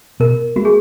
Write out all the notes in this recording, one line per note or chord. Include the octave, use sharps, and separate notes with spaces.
B2 A#4
G#3 B3 F#4
G#4